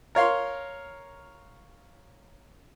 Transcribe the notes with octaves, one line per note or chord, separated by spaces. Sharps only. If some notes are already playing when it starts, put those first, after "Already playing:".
A#4 C#5 F5 C6